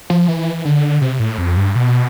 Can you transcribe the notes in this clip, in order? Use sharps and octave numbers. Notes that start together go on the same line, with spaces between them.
F3
E3
D3
C3
A2
F2
G2
B2